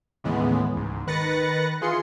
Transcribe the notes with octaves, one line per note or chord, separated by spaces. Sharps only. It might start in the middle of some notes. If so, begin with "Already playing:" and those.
D#2 A2 C#3 E3 G#3 B3
C#2 G#2
D#3 B4 F#6 A6 A#6 C#7
E3 F4 G#4 C6 C#7